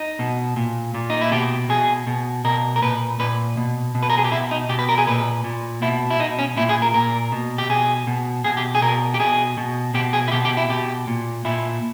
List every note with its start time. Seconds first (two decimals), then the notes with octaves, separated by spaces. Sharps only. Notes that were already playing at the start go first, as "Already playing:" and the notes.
Already playing: D#4
0.19 B2
0.56 A#2
0.94 A#2
1.10 D#4
1.21 E4
1.32 B2 G4
1.69 B2 G#4
2.07 B2
2.44 B2 A#4
2.76 A#4
2.82 A#2 B4
3.19 A#2 B4
3.57 B2
3.95 B2
4.03 B4
4.10 A#4
4.18 G#4
4.24 G4
4.32 B2 E4
4.51 D#4
4.69 B2 G4
4.79 B4
4.89 A#4
4.98 G#4
5.07 A#2 B4
5.44 A#2
5.82 B2 E4
6.10 E4
6.20 B2 D#4
6.39 C#4
6.57 A#2 E4
6.69 G#4
6.82 A#4
6.94 A#2 A#4
7.32 B2
7.58 G4
7.70 B2 G#4
8.07 B2
8.44 B2 G#4
8.57 G4
8.75 G#4
8.82 B2 A#4
9.14 G4
9.20 B2 G#4
9.57 B2
9.94 B2 G4
10.13 G#4
10.28 E4
10.32 B2 G4
10.45 G4
10.57 E4
10.69 B2 G4
11.07 A#2
11.45 A#2 E4